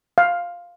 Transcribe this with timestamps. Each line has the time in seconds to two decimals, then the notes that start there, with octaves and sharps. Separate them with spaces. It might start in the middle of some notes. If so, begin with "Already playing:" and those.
0.18 F5